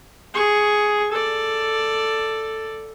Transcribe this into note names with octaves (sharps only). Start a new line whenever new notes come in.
G#4 C#6
A4 D5